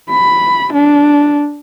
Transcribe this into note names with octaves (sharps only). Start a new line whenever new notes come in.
B5
D4